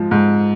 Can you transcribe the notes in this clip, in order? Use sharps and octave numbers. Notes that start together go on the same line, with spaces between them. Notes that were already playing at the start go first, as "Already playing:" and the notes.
Already playing: G#2 F3
G#2